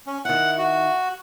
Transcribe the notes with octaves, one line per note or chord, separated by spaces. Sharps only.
C#4
D#3 E4 F#5
F#4